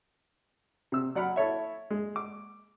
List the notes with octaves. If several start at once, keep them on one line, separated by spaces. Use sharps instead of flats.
C3 E6
F#3 D5 F#5 B5 F6
E4 A4 C#5 E5
G#3
D6